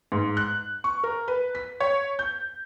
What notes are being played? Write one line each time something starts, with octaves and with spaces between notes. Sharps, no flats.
G#2
F#6
C#6
A#4
B4
B6
C#5
G6